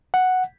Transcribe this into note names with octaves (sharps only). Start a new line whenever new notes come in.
F#5